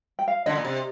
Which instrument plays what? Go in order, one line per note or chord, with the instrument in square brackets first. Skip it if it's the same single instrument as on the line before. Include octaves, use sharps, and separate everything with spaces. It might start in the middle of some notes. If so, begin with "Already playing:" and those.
[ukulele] G5
F5
[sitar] D3 [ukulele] D#5
[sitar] A#2
C3